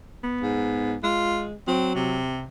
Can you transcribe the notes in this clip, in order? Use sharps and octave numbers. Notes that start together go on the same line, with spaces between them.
B3
G#2
G#3 F4
F#3 C4
C3